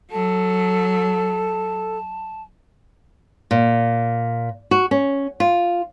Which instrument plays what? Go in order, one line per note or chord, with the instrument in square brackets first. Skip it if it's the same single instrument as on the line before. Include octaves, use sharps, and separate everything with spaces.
[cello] F#3 [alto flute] A4 [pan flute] A5
[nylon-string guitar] A#2
F#4
C#4
F4